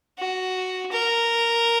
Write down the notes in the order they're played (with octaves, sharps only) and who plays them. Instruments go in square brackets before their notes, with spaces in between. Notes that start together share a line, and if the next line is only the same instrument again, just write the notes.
[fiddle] F#4
A#4